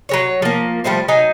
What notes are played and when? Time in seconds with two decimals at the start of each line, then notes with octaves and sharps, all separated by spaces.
0.09 F#3 G#3 C#5
0.42 F3 A#3
0.84 F3 G3 A3 C5
1.08 F#3 D#4 G#5